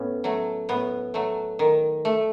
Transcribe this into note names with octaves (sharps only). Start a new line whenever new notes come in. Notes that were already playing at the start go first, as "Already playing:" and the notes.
Already playing: A2 B3 C#4
F#3 A3
A2 B3
F#3 A3
D#3
A3